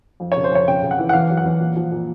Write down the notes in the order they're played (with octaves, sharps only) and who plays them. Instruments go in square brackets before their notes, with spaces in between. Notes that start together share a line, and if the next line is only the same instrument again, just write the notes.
[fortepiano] F2
C#3 C#5
C5
F2 C#5
C#3 G5
C#3
F#5
E3
F#5
E2 F5
F#3
F#5
E2
A#2
F3
A#2